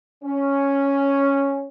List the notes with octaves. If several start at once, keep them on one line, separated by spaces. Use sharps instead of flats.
C#4